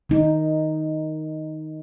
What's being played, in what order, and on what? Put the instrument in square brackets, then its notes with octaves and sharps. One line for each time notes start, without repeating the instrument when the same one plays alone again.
[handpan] D#3 D#4